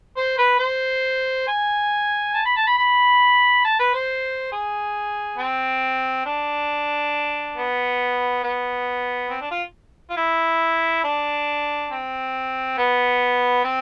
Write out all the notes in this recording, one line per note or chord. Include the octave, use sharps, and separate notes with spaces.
C5
B4
C5
G#5
A5
B5
A5
B5
B5
A5
B4
C5
G#4
C4
D4
B3
B3
C4
D4
F4
F4
E4
D4
C4
B3
C4